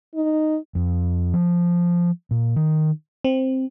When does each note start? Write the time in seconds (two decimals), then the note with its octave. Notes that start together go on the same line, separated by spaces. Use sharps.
0.15 D#4
0.75 F2
1.34 F3
2.31 A#2
2.56 D#3
3.24 C4